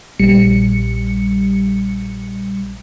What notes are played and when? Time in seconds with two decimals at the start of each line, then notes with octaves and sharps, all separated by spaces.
0.19 A#1 G3 C#7